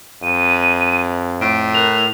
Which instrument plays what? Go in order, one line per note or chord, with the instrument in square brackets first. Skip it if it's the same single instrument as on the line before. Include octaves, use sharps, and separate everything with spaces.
[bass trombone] F2 [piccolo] D#7
[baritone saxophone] A2 [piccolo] D7
[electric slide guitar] A#4 [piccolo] F#6